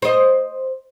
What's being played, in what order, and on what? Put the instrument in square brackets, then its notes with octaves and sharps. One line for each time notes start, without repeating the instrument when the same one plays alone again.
[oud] C5 D#5